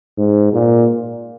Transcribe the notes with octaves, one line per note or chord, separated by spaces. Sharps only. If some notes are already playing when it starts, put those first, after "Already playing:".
G#2
A#2